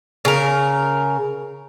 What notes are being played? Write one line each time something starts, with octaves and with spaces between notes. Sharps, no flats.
C#3 A#4